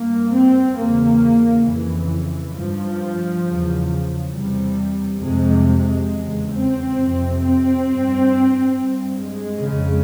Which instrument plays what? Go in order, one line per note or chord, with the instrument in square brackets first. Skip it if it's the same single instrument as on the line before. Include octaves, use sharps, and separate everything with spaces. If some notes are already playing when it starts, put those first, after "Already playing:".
Already playing: [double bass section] G2 A#3
C4
E2 C#3 A#3
F2 C#3 E3
G2 F3
E2 C#3
E2 C3 G3
F2 C3 G#3
G#3
E2 C#3
C4
F2 C3
C4
G2
G2
G#3
F2 C#3